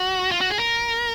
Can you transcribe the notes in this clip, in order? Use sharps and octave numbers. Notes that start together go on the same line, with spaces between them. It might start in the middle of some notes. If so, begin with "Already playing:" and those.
Already playing: F#4
F4
F#4
G#4
A#4